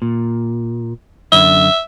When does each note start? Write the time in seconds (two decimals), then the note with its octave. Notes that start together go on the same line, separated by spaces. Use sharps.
0.02 A#2
1.32 F#2 D3 E5